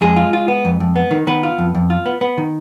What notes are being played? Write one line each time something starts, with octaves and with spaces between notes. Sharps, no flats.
F2 G#3 G#4
F4
F4
B3
F2
F2
B3
D#3
D#3 B3 B4
F4
F2
F2
F4
B3
B3
D#3